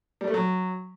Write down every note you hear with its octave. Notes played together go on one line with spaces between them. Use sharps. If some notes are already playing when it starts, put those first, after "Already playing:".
G3
A3
F#3